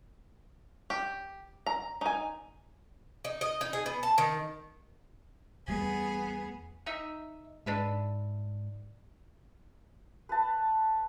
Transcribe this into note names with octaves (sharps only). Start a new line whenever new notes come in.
G4
A#5
D#4 G#5
D#4
D#5
D#4
G#4
B3
A5
D#3
E2 G3 A3 B3 G#4
D#4 D#5 E5
G#2 D4 B4 E5
B4 A5